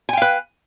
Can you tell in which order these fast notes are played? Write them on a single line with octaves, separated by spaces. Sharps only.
G#5 G5 F5 B4